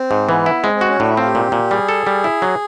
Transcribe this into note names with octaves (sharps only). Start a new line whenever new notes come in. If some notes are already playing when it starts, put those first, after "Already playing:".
Already playing: C4
G#2
E3 B3
E4
G#3 C4
C4
F#4
C#4
A2 D4
E4
C4 F4
G4
A#2
A#2
G3 G#4
A4
G3
E4
F#3